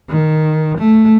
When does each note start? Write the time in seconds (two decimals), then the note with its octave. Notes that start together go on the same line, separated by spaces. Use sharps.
0.10 D#3
0.79 A3